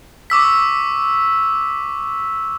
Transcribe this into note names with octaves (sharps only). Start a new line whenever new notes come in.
C#6 D6 E6 B6